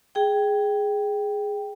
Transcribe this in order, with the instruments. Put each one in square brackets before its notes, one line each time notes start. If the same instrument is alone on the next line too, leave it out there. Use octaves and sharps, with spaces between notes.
[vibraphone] G#4 G5